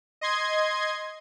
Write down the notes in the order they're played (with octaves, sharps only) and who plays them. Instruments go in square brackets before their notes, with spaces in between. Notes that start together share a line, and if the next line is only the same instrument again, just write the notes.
[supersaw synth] D#5 C6 G#6